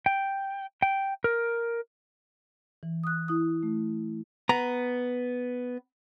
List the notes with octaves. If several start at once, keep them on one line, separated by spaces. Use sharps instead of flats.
G5
G5
A#4
E3
D#6 F#6
E4 D#6
A3
B3 A#5